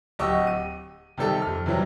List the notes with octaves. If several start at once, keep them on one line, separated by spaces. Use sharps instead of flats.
D1 G4 D#5 F#5 C#6 E6
D#7
C3 D#3 G3 G4 A4
F2 F6
C3 E3 F#3 G3